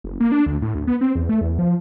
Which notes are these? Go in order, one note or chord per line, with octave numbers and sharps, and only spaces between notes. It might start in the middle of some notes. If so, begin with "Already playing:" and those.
F#1
A#3
D4
D2
A2
D2
B3
C4
E2
A3
E2
F3